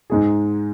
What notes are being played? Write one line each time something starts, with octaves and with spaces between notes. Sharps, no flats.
G#2 G#3 D#4 G#4